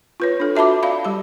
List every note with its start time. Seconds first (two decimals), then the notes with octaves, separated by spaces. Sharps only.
0.20 F4 B4 C#5
0.40 D4 A4
0.55 F#4 E5 A5 B5 D6
0.83 D5 F5 B5
1.05 G3 G4 B5